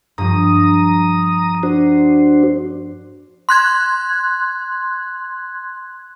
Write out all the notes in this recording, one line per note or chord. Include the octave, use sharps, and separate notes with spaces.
G2 F3 A#5 D#6
D4 F#4 C5
C6 F#6 G#6